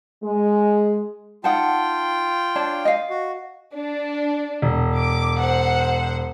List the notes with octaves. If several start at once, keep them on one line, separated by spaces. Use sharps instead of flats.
G#3
D#4 F4 F#5 G5 A5
D4 C#5 A5
D#5 F5
F#4
D4
E1
D6
C5 F#5